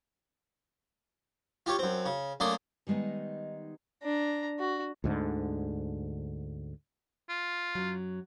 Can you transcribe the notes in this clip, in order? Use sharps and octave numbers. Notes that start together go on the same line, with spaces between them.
F4 G4 C#5
F#2 C4
C#3
F#2 A3 A#3 D5 C6 D#6
D#3 G3 G#3 B3 D#4
D4 A#5
F#4
D2 G#2 D3
F4
F#2 F#3